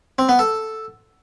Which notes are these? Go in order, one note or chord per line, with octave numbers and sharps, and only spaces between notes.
C4
B3
A4